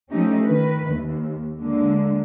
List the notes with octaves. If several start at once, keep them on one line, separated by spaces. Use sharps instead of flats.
F3 A3 C#4 D#4 G4
D#3 B4
D#2
D3 G#3 A#3